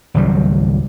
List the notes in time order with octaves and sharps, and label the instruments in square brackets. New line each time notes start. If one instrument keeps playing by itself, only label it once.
[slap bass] G#1 C#2 F#3 G3